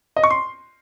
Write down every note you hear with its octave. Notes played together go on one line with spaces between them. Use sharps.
D#5
C#6
C6